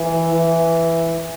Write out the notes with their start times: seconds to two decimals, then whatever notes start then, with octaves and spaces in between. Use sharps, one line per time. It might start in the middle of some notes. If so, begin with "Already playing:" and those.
Already playing: E3
0.34 E3